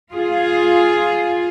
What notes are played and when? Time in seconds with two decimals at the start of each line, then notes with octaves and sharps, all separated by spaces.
0.13 F4 G#4